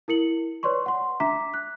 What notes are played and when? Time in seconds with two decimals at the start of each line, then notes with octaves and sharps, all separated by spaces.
0.08 E4 A#4 C#7 F#7
0.63 B4 C#5 D5 C6 C#6
0.86 F#5 C6
1.20 D4 E5 A#5 D6 B6
1.54 F#6